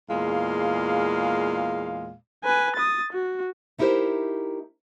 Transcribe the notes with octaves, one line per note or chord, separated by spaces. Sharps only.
E2 A#2 G#3 F5
B4 G#5
D#6 A6
F#4
A3 D#4 E4 G4 A#4 C5